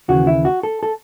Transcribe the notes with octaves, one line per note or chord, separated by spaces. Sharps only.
D#2 C#3 E3 F#4
E4
F#4
A4
A4